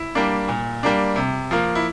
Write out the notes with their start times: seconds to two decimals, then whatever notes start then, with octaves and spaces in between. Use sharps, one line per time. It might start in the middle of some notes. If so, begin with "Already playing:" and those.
Already playing: E4
0.15 G3 A#3 D4
0.48 A#2
0.83 G3 A#3 D4
1.16 C3
1.51 F3 A#3
1.75 E4